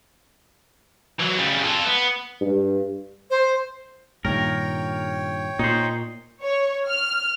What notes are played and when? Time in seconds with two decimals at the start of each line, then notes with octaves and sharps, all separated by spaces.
1.20 E3 F#3
1.38 C#3 G3
1.64 F4 A4
1.87 B3
2.41 G2
3.30 C5
4.25 G2 A#2 D#3 A#4 C#5 G5
5.59 A#2 D#4 C5
6.42 C#5
6.89 F6